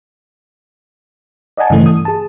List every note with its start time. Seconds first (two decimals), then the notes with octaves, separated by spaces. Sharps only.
1.57 D5 D#5 F#5 G#5 A5
1.70 G2 C#3 E3 A3
1.86 D#6
2.05 G#4 A5